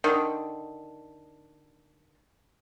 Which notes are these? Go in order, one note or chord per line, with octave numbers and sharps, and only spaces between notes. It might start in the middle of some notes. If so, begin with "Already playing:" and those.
D3 D#3